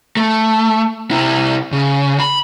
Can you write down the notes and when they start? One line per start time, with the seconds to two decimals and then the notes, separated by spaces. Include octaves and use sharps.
0.17 A3
1.11 C3 E4
1.72 C#3
2.20 B5